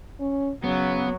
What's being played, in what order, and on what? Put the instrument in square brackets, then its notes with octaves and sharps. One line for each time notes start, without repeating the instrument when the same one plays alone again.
[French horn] C#4
[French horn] C#3 [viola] F#3 [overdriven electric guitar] B3